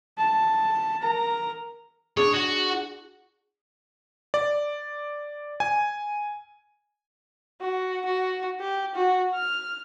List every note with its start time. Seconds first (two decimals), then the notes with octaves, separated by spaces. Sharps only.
0.18 A5
1.01 A#4 A#5
2.17 D4 G#4 C#5
2.34 F#4
4.34 D5
5.60 G#5
7.61 F#4
8.06 F#4
8.60 G4
8.95 F#4
9.35 F6